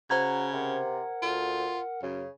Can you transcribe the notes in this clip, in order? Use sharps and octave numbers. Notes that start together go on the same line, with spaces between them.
C#3 F#4 C5 A#5 G#6
C3 A#4 F#5
D2 F4
F#2 C#3